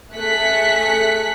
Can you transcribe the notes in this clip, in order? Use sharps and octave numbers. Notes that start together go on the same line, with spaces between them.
A3 G#4 A4 F#6 B6 C#7